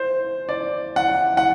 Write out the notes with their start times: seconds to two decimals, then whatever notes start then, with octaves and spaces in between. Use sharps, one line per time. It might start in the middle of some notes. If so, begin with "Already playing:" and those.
Already playing: C5
0.49 D5
0.96 F#5
1.37 F#5